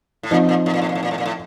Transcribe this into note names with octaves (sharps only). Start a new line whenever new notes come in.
A2
A#2 F3 C4 D#4
A#2
A2
A#2
A2
A#2
A2
A#2
A2
A#2
A2